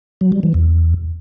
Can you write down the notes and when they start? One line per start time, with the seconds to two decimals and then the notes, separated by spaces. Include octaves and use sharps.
0.21 F#3
0.32 G3
0.43 E3
0.54 E2